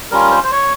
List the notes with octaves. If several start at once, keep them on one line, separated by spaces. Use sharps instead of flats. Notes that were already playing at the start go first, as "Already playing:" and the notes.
G3 C#4 F4 A#4
C5
C5
C#5